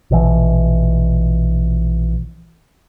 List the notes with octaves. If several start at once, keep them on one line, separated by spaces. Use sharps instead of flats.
A#1 B2 E3